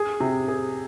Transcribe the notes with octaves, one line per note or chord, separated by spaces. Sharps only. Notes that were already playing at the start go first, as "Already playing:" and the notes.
Already playing: G#4
C3
G#4